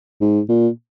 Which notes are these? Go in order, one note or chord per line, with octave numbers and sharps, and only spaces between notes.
G#2
A#2